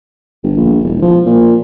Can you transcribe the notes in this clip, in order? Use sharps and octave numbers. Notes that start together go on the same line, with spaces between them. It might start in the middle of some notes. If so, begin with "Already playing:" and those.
G1
A#1
E1
F3
A#2